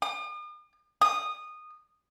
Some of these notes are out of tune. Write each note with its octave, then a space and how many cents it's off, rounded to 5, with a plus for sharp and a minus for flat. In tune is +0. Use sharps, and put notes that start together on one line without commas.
D#6 -45
D#6 -15